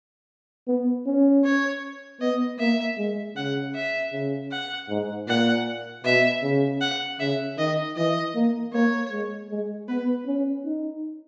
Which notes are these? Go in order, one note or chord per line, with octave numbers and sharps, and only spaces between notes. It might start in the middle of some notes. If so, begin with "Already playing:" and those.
B3
C#4
C#5
B3 D#5
A#3 E5
G#3
C#3 F#5
E5
C#3
F#5
G#2
A#2 F#5
B2 E5
C#3
F#5
C#3 E5
D#3 D#5
E3 D#5
A#3
A#3 C#5
G#3
G#3
B3 B4
C#4
D#4